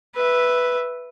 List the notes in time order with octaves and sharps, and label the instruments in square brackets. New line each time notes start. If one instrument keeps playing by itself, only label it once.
[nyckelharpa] B4 E5